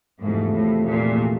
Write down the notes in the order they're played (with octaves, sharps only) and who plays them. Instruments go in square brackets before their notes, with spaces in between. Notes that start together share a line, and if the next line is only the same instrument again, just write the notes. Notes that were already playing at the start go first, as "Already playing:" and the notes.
[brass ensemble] E2 C3 F3 A3 [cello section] G#2
[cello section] A2
A#2